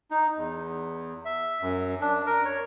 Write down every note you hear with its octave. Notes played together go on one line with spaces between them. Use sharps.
D#4
E2
E5
F#2
D4
A#4
C#5